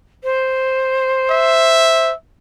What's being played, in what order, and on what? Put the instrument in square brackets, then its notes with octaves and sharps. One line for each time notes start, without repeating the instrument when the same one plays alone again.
[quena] C5
[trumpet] E5